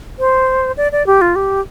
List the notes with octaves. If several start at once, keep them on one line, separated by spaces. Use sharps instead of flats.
C5
D5
D5
G4
F4
G4